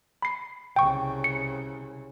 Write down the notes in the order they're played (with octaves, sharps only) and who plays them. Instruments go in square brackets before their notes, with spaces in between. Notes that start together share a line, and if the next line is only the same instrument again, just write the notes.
[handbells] B5 C7
[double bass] C2 C#3 [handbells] G5 C#6
[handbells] C#7